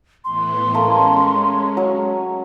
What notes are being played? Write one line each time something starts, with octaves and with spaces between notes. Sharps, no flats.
A2 E3 B3 C6
G#3 A3 C#4 A#4 F5
F#3